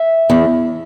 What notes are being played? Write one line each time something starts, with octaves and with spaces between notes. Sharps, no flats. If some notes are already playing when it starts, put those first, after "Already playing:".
Already playing: E5
E2